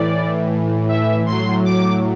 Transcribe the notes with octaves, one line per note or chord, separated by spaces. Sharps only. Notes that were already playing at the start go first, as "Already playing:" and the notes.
Already playing: A2 E3 D5
E5
A2 F#3 C6
D6